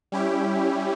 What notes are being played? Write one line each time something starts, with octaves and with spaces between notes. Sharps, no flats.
G3 C#4 E4 G4